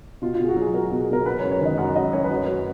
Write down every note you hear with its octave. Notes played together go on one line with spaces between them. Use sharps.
B2 F4
F4
B2 G#4
F#4
F#3 G#4
F#3 A#4
F#4
B2
G#4
B2 A#4
F#3 B4
C#5
F#2
C#5
D#3 D#5
F#2 F#5
F#3 D#5
F#2 C#5
B4
F#3
C#5
F#2